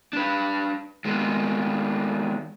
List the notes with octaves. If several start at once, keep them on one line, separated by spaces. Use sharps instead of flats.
D4 B4
D#3 G#3 A#3 B3